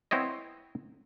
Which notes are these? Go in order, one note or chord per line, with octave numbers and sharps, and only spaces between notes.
B3 C4 E4 C#5 D#5